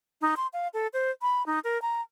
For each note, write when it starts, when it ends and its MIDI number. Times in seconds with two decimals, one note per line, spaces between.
0.21 0.35 63
0.37 0.47 84
0.53 0.68 77
0.74 0.87 69
0.93 1.11 72
1.22 1.45 83
1.46 1.59 63
1.64 1.81 70
1.82 2.01 82